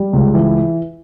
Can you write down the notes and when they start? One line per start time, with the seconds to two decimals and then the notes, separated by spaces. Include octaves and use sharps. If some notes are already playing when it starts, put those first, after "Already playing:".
Already playing: G3
0.13 C#2
0.34 E3